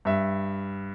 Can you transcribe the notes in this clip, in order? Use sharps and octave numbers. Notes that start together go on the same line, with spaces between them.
G2 E5